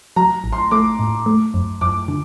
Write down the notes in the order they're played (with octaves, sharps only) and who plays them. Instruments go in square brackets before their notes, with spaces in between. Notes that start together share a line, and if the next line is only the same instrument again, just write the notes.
[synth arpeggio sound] F#3 [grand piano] A#5
[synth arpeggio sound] A1
[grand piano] C6
[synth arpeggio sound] A3 [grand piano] D6
[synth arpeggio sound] A2
A3
F#2
[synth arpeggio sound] F#2 [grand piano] D6
[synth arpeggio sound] D3